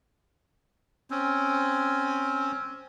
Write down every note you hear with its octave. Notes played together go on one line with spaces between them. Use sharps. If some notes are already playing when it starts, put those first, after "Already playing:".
C4 C#4